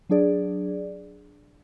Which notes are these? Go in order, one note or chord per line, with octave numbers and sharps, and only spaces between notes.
F#3 D4 G#4 D5